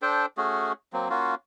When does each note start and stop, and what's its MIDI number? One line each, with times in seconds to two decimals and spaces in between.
0.02 0.26 62
0.02 0.26 69
0.02 0.26 72
0.02 0.26 79
0.37 0.73 57
0.37 0.73 61
0.37 0.73 66
0.37 0.73 68
0.93 1.08 54
0.93 1.08 58
0.93 1.08 60
1.10 1.35 58
1.10 1.35 61
1.10 1.35 65
1.10 1.35 66